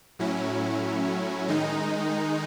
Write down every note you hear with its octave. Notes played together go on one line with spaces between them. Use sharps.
A2 F#3 C#4 E4
D#3 G#3 D#4